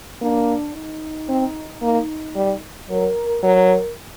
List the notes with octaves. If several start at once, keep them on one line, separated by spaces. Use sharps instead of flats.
A#3 D4
D#4
C4
A#3
G3
F#3 A#4
F#3 A#4